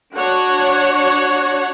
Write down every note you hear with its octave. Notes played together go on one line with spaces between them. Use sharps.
D4 F#4 C#5 F#5